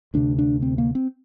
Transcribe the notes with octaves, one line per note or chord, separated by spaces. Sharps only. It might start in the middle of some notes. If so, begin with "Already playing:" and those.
D2 C3 D4
D4
C4
A#3
C4